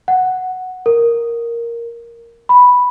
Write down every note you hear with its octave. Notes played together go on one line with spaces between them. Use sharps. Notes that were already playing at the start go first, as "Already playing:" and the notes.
F#5
A#4
B5